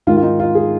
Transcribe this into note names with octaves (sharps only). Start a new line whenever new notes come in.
G#2 D#3 F4
F4
D#4
F4
G#4